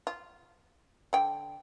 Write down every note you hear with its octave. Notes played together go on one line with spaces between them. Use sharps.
F4
D3 G5